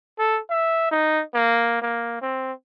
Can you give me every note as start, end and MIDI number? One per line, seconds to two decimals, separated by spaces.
0.19 0.39 69
0.50 0.90 76
0.91 1.23 63
1.34 1.77 58
1.82 2.18 58
2.21 2.52 60